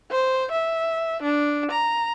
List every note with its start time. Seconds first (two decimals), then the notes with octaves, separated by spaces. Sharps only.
0.11 C5
0.51 E5
1.22 D4
1.71 A#5